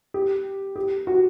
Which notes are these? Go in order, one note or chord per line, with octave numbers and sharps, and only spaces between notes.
G4
G4
F#4